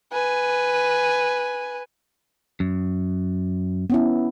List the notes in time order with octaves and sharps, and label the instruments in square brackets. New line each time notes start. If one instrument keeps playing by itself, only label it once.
[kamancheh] B4 G#5
[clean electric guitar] F#2
[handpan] B3 C#4 E4